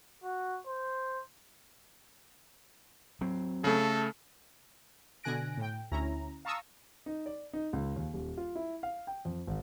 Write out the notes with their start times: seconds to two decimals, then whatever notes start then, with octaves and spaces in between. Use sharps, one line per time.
0.24 F#4
0.67 C5
3.21 F#3 C4
3.64 C#3 A3 A4
5.24 B2 D3 G#5 F#6 A#6 D7
5.57 A2 G5
5.92 D2 C#4 E4 A#5
6.45 F5 A5 A#5 C#6 D#6 E6
7.06 D#4
7.26 D5
7.53 D#4
7.73 C#2
7.96 D#2
8.14 D#1
8.37 F4
8.56 E4
8.83 F5
9.07 G5
9.25 F2
9.47 G#1